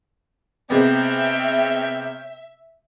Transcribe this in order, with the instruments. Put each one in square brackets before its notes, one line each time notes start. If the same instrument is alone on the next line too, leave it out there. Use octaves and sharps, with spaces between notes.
[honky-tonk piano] C3 G#3 B3 [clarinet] C4 [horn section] C#5 F5 G5 [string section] E5